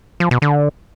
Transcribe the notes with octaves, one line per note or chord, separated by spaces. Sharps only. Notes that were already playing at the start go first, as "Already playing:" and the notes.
F3
B2
D3